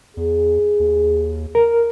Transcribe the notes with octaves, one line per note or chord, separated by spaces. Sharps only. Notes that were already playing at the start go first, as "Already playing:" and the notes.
E2 G#4
D#2
A#4